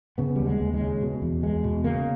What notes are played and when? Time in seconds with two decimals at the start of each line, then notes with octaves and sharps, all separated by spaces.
0.18 C#3 B3
0.36 D#2 G3
0.46 G#3
0.60 D#2
0.74 G#3
0.81 C#3
1.02 B2
1.22 E2
1.43 E2 G#3
1.64 B2
1.84 C#3 A#3